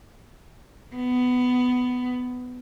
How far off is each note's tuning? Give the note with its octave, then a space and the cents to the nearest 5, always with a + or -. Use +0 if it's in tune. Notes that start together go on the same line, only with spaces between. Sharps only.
B3 +15